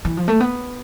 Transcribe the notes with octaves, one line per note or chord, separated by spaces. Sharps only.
E3
F3
A3
B3